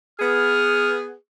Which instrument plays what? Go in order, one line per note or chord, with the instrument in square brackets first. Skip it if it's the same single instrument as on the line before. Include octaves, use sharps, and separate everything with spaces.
[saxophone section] B3 G#4 [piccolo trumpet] F6